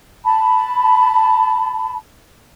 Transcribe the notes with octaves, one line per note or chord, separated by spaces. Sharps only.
A5 B5